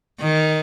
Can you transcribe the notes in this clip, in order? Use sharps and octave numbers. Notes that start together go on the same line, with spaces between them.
D#3